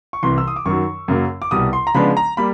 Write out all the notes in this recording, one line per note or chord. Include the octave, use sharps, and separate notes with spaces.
C#6
C2 C3 E3 C6
E6
D#6
D6
F#2 D#3 F#3 C#6
F#2 C#3 F#3 A#3
D6
C2 B2 G3 D#6
C6
A#5
C#3 F3 G#3 B3 D4 B5
A#5
G3 A#3 B5